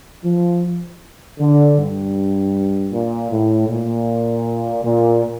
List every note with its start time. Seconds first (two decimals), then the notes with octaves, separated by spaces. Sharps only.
0.25 F3
1.40 D3
1.78 G2
2.93 A#2
3.32 A2
3.69 A#2
4.84 A#2